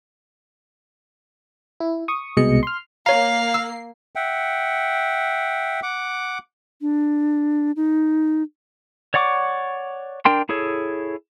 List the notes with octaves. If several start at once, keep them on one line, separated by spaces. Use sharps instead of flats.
E4
C#6 D#6
C2 B2 G#3 D#5 C#7
C6 F6
A#3 C#5 F5 A#5 C7
E6
E5 F#5 G5
F#5 D6
D4
D#4
C#5 D5 F#5 C#6 D6
D4 A#4 G5 C6
E4 G#4 A4 C#5